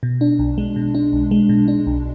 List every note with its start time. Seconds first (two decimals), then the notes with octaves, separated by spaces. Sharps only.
0.03 B2
0.21 D4
0.39 B1
0.58 G#3
0.76 B2
0.95 D4
1.13 B1
1.31 G#3
1.49 B2
1.68 D4
1.87 B1